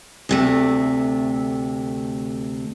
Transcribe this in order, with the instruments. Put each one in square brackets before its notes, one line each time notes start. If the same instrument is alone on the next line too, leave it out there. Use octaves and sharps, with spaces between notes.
[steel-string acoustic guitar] D2 C3 A3